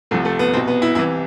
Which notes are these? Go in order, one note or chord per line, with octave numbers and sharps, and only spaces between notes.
C2 C3 F3 A3
A3
B3
C2 B2 C4
B3
E4
C2 C3 E3 E4